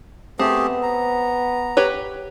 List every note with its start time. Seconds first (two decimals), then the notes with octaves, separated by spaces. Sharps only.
0.39 A3 B3 C4 G4 G#4
0.83 A#5
1.77 G4 B4 C#5